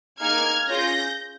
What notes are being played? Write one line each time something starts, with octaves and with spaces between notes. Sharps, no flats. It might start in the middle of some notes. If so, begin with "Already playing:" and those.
A#3 D#4 G#4 F6 G#6
C#4 F4 G#4 G6 A#6